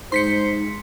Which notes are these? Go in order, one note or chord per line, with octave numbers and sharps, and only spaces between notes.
G2 G#3 D#4 C5 C6 B6 C#7